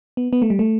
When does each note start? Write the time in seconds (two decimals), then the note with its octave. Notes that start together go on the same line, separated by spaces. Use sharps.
0.17 B3
0.33 B3
0.42 A3
0.50 G3
0.59 A3